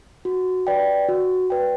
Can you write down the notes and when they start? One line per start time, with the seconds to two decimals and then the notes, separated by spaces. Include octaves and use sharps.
0.25 F#4
0.67 B4 D5 G5
1.09 F#4
1.50 B4 D5 G5